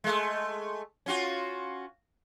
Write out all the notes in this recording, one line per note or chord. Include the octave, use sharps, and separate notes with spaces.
G#3 A3
C#4 F4 F#4